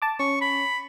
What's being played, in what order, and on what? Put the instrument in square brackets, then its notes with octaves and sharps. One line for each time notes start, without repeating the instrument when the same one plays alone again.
[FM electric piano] A5 D6
[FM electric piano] C#4 [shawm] C#6
[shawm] B5